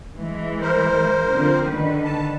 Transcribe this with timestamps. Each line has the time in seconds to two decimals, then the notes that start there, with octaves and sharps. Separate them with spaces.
0.16 E3 G#3
0.61 A#4 C5
1.30 D3 F3 C4
1.69 D3 D#3 B4
2.05 A5